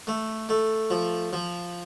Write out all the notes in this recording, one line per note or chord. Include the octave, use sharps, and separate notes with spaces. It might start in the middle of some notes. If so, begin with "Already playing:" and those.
A3
A3
F3
F3